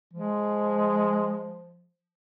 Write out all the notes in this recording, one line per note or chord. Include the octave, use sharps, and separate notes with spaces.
F3 G#3